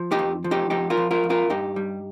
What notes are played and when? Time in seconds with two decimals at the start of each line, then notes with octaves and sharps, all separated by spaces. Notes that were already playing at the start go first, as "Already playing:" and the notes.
Already playing: F3
0.12 D#4 G4
0.19 F2
0.44 F3
0.51 D#4 G4
0.70 F2 D#4 G4
0.90 F4 A#4
0.97 F3
1.11 F4 A#4
1.24 F2
1.30 F4 A#4
1.50 G2 D#4 G4
1.76 G3